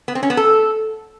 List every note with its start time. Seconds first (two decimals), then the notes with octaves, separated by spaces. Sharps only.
0.08 B3
0.15 C4
0.23 C#4
0.30 B3
0.37 A4